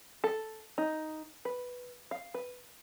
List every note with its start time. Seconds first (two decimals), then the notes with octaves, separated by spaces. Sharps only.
0.24 A4
0.78 D#4
1.45 B4
2.11 F5
2.34 B4